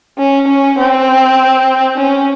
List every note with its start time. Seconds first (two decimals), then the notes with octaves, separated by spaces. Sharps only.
0.18 C#4
0.48 C#4
0.78 C4
1.98 C#4